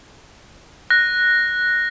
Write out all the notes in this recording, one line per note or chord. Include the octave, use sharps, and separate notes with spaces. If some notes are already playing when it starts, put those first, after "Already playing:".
F#6 A#6